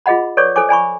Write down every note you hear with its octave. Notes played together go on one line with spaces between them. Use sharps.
F4 G#4 D#5 F#5 B5
A4 B4 C#5 D5 C#6 D6
A4 C5 G#5 D6
D5 G#5 B5 C#6